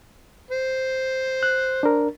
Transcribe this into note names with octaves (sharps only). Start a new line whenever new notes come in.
C5
F#6
D4 A#4